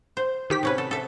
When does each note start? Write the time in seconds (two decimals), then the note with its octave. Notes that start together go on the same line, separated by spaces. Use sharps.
0.17 C5
0.50 D#3 G4 B6
0.63 C3 C#4 B4
0.78 A4
0.91 A4 E5